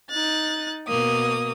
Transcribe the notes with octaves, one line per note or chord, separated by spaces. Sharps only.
D#4 F#6 A6
B2 A#3 D#6